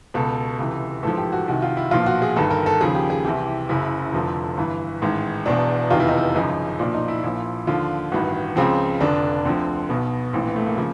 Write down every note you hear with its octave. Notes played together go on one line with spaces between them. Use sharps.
C#2 B2 A4
C#2 C3 E3
A1 G#2 F3 A4
G4
F#4
C2 C3 D#3 F#4
F4
E4
B1 A#2 F3 F4
F#4
G#4
G1 G2 D#3 A4
A#4
A4
D#2 C#3 F3 G#4
G4
G#4
C2 C3 E3 G4
F#1 F#2 C#3 E4
F1 F2 D3 F3
G1 G2 E3
A1 G#2 D#3
E1 E2 B2 D4
F1 E2 C3 D#3 F4
E4
D#4
E4
G#1 F#2 C#3 F3 D#4
B1 A#2 F3 D4
D#4
E4
A#1 A#2 F3 E4
D#2 D3 F3 F4
A1 G2 D#3 F#4
C#2 C#3 F3 C4
F1 F2 D3 D4
D2 D3 F3 C4
B1 B2 B3
A#1 A2 E3 C4
B3
A3
A#3
C#3 F3 A#3